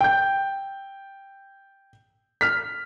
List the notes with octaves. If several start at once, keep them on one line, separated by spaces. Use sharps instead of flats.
G5 G6
F6 B6